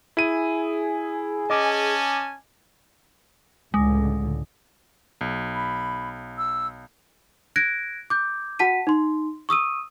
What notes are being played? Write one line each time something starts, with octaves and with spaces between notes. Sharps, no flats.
E4 G#4 D#7
C#4 D#5 G#5 A5 D6
C#2 A2 D3 G#3
B1
B5
E6
F#6 G#6 A#6 D7
D6 G6
F#4 F#5 A5 B6 D#7
D#4 C6
C#6 D#6 E6 D#7